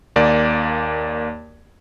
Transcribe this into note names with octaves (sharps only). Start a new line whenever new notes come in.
D#2 A#3 D5